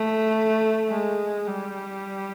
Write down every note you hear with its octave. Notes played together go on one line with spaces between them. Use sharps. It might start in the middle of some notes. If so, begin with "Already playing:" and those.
Already playing: A3
G#3
G3